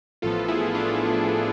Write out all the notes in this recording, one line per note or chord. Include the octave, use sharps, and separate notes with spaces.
A1 A2 F3 B3 F4 A4
E4 G#4
D4 F4